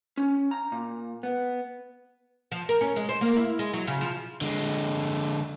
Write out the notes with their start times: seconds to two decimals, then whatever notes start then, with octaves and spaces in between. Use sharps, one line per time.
0.17 C#4
0.51 A#5
0.72 A#2
1.23 B3
2.52 F3
2.69 A#4
2.81 C#4
2.96 G#3
3.09 C5
3.21 A#3
3.36 E4
3.59 G#3
3.74 F#3
3.87 C#3
4.01 F3
4.41 D3 G#3